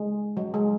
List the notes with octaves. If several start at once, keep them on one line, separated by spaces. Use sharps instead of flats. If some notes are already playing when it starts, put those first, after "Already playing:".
Already playing: G#3
F#3
G#3